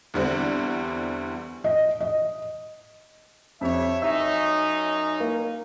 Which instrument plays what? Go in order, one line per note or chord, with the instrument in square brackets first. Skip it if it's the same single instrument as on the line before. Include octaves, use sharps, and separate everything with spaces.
[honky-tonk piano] E2 D3 G3 C4
[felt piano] D#5
D#5
[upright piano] F2 [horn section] G4 C#5 E5
[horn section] F#2 C#4 D#4 [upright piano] E5
[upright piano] A#3